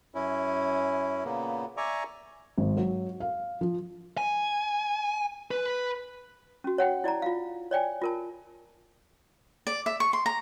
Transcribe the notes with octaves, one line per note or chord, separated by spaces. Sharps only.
F#2 C#4 E4
A#2 C#3 A#3 B3
D5 E5 G#5 A#5 C#6 D6
G#1
F#3
F5
F3
G#5
B4
C#4 F#4
C#5 F#5 G5
E4 D5 A5 A#5
F4 F5
C#5 D5 G5 G#5
F4 A#4 A5
D5
E5
C#6
C6
A#5